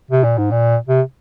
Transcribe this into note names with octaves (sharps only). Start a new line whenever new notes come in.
C3
A#2
G#2
A#2
C3